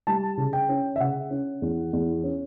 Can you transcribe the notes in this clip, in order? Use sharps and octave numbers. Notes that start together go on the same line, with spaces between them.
G3 A5
C#3
G5
C#4
E5
C#3 F#5
C#4
E2
E2
C#4